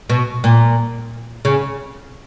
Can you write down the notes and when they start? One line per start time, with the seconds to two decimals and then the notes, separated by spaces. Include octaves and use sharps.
0.10 B2
0.44 A#2
1.45 C#3